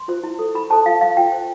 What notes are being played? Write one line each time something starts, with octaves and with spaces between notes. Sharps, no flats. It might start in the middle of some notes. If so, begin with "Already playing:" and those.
Already playing: C6
F4 C5
E4
A4 C5
E4 B5
A4 C5 A5
F4 F5
C5 F5
F4 G5
C5